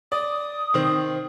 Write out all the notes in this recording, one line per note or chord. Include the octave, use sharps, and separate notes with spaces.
D5 D#6
D#3 C4